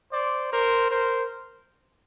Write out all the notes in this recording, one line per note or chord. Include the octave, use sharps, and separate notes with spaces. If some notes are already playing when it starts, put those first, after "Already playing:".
C5 D5
A#4 C5
A#4 C5